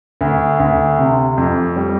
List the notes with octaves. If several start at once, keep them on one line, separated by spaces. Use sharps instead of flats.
D2
D2
C3
F2
G3